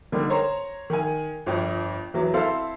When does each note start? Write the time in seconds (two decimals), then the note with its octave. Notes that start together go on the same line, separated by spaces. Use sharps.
0.12 D3 G3 A#3 D#4
0.30 C5 C#5 A#5
0.90 D#3 G#5
1.46 G1 F2
2.14 E2 E3 F#3
2.34 C4 E4 A4 C5 F5